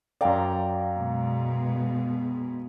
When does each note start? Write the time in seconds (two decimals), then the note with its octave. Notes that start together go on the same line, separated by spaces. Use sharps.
0.21 F#2 D5 F5 G5 A#5
0.97 B2 G#3